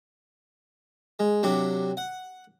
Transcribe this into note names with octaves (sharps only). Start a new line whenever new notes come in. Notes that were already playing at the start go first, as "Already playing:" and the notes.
G#3
C3 F#3 D4 G4
F#5